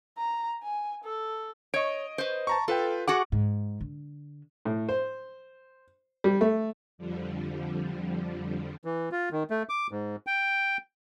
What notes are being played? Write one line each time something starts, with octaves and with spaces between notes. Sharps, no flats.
A#5
G#5
A4
C#5 D#5 D7
B4 C5
A5 A#5 C#6
F4 A4 B4 G5
F#4 G#4 F#5 D6
G#2
D3
A2
C5
G3
A3
F2 D3 F3 G3
E3
F4
D#3
A3
D6
G#2
G5